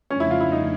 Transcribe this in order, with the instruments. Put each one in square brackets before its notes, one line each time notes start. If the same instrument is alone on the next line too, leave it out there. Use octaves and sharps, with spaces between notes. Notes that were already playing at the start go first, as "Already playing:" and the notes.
[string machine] F2 C#3 F3 A3 D4 [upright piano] C#4
[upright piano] E4
F4
E4
D#4